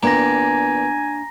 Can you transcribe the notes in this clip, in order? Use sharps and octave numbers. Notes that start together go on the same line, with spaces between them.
E2 A#2 A#3 D4 G5 G#5 A#5 A#6